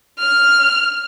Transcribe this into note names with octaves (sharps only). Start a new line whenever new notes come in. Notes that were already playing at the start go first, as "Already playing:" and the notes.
F6